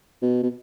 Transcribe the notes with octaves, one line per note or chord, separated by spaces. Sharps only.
B2
B2